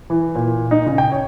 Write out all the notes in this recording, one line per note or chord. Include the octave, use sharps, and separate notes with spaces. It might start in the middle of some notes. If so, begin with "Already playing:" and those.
E3
A#2
D#4
C#3
G5
C#5